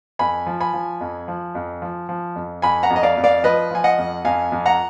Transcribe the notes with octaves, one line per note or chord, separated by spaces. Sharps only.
F2 G#5 B5
F3
G#5 B5
F3
F2
F3
F2
F3
F3
F2
F2 G#5 B5
F#5 A#5
F2
D#5
D5 F5
F2
D5 F5
F3 B4 D#5
F3 G#5
D#5 F#5
F2
F2 F5 G#5
F2
F#5 A#5